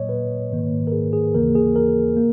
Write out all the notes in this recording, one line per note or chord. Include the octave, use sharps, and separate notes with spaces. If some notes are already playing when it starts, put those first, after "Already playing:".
Already playing: A#2 F#3 A#3 C#5 D#5
B4
G#2 D#3 A#3
A#4
G#4
G#4
D#2 C#3 E3 A#3 A#4
G#4
A#4
A#3